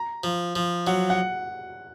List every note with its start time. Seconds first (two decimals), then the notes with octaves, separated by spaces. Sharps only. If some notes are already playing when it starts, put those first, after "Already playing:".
Already playing: A#5
0.24 F3
0.56 F3
0.87 F#3 F#5
1.10 F#5